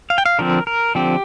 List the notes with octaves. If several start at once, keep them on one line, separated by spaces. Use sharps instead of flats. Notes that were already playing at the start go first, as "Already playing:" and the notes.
F5
G5
F5
D3 F3 C4 A#4
A#4
D3 F3 C4 G4